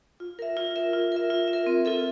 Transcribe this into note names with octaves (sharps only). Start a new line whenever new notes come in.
F4
A#4 E5
F4
A#4 E5
F4
A#4 E5
F4
E5
A#4
C4
F4 A4 E5